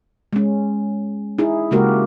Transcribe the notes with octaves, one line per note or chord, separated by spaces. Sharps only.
G#3 C#4
D#4 E4 G#4
C#3 G#3 A#3 F#4 G4 A#4